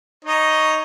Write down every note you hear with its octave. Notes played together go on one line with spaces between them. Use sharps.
D#4 C#5 D#5